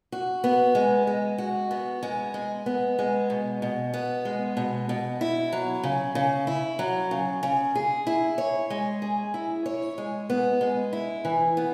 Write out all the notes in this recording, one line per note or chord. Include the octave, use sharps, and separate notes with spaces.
F#4
B3
G#3
G#3
F#4
B3
G#3
G#3
B3
G#3
B2
B2
B3
G#3
B2
B2
E4
F#3
C#3
C#3
E4
F#3
C#3
C#3
G#4
E4
C#5
G#3
G#4
E4
C#5
G#3
B3
G#3
E4
E3
B3